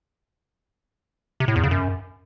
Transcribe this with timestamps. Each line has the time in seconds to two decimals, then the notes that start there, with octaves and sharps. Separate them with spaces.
1.40 C3
1.48 A2
1.56 E2
1.63 C#3
1.71 F#2